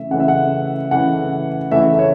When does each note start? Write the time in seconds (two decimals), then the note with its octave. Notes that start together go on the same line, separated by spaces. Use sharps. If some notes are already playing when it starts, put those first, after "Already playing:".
Already playing: C#3 E3 A3 E5
0.11 C#3 E3 A3 F#5
0.20 E5
0.28 F#5
0.91 C#3 E3 A3 F#5
1.71 C#3 E3 A3 E5
1.99 C#5